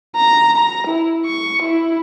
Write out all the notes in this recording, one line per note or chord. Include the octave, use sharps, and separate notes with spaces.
A#5
A#5
E4
C#6
E4